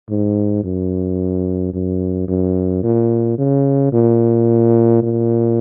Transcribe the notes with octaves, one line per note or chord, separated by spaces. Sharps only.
G#2
F#2
F#2
F#2
A#2
C#3
A#2
A#2